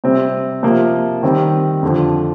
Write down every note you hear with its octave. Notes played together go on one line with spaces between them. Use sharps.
C3 G3 C4
C3 F3 A#3
D#3 G3 C4
F2 D3 F3